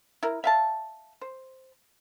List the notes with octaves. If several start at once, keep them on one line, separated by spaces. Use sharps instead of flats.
E4 A#4
E5 F5 A5
C5